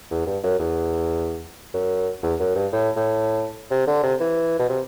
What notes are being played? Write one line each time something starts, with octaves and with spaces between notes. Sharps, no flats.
E2
G2
F#2
E2
F#2
E2
F#2
G2
A2
A2
C3
D3
C3
E3
B2
C3